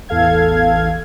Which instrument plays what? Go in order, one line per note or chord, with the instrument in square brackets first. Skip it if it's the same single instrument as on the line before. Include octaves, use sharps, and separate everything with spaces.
[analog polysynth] A1 E2 A4 F5 G#6